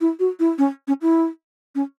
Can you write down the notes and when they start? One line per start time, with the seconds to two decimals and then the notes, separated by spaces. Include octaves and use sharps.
0.01 E4
0.20 F#4
0.40 E4
0.58 C#4
0.88 C#4
1.02 E4
1.75 C#4